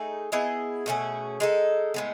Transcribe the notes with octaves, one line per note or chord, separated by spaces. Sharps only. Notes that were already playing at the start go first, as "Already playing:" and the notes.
Already playing: A3 D#4 G#4
B3 E4 G#4 D#5
B2 A3 C#4 G#4
G#3 D#4 A4
A2 G#3 B3